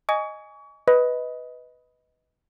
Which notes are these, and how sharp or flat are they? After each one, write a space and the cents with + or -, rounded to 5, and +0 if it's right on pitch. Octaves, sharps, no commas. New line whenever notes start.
D#5 +0 G#5 +0 C#6 +35
B4 +0 D#5 +15